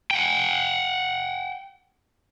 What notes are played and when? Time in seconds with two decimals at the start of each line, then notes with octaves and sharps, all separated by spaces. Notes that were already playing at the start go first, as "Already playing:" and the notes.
0.11 F#5 G5